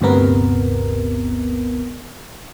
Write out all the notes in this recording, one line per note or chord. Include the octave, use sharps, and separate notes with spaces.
G1 D2 G2 C3 B3 A#4